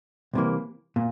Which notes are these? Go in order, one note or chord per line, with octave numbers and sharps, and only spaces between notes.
C2 C3 E3 A#3
A#2